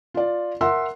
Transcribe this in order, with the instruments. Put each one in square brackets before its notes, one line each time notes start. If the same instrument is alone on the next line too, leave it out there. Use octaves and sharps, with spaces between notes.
[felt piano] F4 D5
A#4 E5 F#5 C6 E6